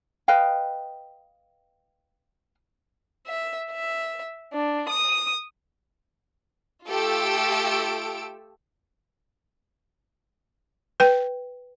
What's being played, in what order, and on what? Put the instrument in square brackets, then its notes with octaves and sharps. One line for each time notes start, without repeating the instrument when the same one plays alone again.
[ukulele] B4 D#5 F5 G5
[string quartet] E5
E5
D4
D#6
[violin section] A3 F4 G4 A4 E6 D7
[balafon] B4 G5